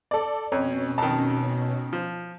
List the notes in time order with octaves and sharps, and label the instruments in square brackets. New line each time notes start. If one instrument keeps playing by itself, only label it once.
[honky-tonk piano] A4 D5
[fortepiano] F2 [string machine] B2 C#4 [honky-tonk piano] C#5
[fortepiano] F2 D#3 [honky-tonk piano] A5
[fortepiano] F3